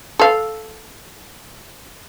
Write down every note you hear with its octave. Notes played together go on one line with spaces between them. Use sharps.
A4 F5